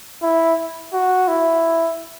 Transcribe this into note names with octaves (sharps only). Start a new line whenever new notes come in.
E4
F#4
E4